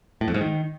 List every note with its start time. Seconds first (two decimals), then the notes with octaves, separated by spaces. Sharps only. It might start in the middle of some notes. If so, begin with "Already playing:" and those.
0.21 A2
0.28 F2
0.34 G#2
0.41 D#3